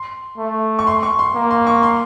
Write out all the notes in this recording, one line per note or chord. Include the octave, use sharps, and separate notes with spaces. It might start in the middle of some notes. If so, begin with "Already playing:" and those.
Already playing: C6
A3
C#6
C6
C#6
C6
A#3
C6
C#6
C6